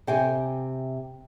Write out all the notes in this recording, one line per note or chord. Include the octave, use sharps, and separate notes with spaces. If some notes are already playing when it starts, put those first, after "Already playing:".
C3 G5 G#5